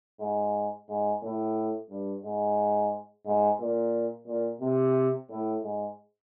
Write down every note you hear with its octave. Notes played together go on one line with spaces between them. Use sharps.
G#2
G#2
A2
G2
G#2
G#2
A#2
A#2
C3
A2
G#2